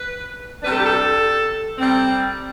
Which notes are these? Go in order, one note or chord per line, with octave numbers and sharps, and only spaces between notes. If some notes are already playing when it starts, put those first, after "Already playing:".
Already playing: B4
C3 G3 D4 B4
A4
G4
A4
C3 G3 C4